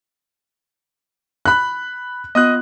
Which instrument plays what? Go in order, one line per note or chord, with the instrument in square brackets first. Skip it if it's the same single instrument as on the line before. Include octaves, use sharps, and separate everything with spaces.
[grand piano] B5 F#6
[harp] B3 F4 [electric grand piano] D#5 D#6 F#6